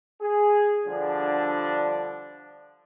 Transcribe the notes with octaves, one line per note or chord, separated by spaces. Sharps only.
G#4
D3 F3 G3 D4